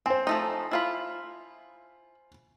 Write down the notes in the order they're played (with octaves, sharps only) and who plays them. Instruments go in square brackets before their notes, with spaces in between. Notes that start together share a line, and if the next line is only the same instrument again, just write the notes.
[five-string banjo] C4 [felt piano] C5 G#5
[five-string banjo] F3 A3 D#4
E4 F4 B5